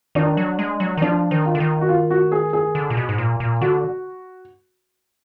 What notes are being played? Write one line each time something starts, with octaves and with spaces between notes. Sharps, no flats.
D#3 D4
F#3
G#3
F#3
D#3
F3 D4
D#3
F4
D3
D#3
F#4
F4
F#4
G#4
G#4
D3
A#2
B2
G#2
A#2
A#2
D3 F#4